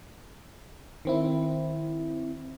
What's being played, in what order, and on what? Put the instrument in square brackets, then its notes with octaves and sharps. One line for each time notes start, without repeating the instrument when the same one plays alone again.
[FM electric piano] D#3 C4 E4